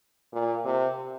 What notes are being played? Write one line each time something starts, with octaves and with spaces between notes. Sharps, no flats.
A#2
C3